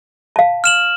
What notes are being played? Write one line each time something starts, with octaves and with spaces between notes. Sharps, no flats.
F5 A5
F6 E7 F#7